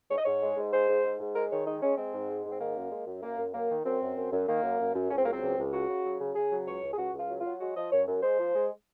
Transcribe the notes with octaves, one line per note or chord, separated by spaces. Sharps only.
G#2 C#5
D#5
G#2 C#5
G#3
G#2
G#3 C5
G#2
G#2
G#2
G#3 A#4
D#3 C#5
G#3 D#4
G#3 C#4
G#3 C4
G#2
G#3
G#2
C4
D#3 A#3
F#2
G#3
F#2
F#2 A#3
F#2
F#2 A#3
D#3
F#2 C4
F#2
F#2
F#2
D#3 A#3
F#2
F#2
F#2
C#2 C#4
C4
F#3 A#3
C4
C#2
C#2
C#3 F#4
C#3
F#3
C#3
C#3 G#4
F#3
C#2 C#5
C#2
G#4
C#2 F#4
C#2
F4
F#3
F#3 F4
G#3 F#4
F3 D#5
F#2 C#5
F#2
G#3 C5
F3
G#3